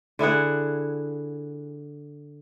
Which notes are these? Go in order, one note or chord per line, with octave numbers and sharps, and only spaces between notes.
D3 E4 G#4 F#5